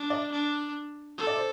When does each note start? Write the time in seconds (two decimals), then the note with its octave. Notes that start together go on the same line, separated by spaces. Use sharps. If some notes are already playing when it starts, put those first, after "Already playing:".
Already playing: D4
0.10 D5
0.32 D4
1.18 A4
1.27 D5
1.36 C5